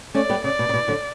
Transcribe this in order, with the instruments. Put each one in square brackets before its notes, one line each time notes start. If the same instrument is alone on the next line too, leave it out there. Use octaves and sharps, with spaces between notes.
[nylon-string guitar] A3 C#4 [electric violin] D5
[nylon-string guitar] G3 B3
[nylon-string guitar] C#3 [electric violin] D5
[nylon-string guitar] B2
C#3
B2
D3 F#3